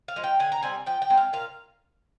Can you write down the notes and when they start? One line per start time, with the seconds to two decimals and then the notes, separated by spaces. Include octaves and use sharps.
0.08 F5
0.16 F3 G#3
0.24 G5
0.39 D3 G#5
0.52 A#5
0.62 G3 C4 G#5
0.86 F3 G5
1.02 G5
1.10 G#3 C4
1.17 F5
1.33 A#2 F5